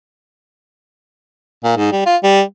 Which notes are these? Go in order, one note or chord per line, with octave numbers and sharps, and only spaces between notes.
A#2
G#2
G3
F4
G3